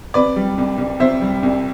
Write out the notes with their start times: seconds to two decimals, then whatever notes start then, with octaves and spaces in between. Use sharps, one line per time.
0.14 C3 B4 D5
0.36 G3
0.58 C2
0.78 C2
1.00 C3 C5 E5
1.21 G3
1.43 C2